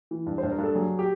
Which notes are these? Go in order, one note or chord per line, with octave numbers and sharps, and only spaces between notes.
E3
G2
C5
G2
A#4
G2
A4
F#3 G#4
G4